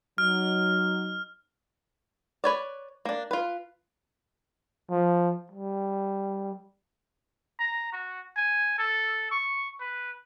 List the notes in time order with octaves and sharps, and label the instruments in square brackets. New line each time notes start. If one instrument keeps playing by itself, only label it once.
[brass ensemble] F#3 D#4 [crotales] F6
[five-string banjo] B4 C#5 D5
A#3 D4
F4 B4
[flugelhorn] F3
G3
[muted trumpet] A#5
F#4
G#5
A4
C#6
B4